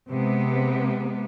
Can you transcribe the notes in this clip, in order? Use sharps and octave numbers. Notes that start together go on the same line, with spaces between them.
C3 G#3 B3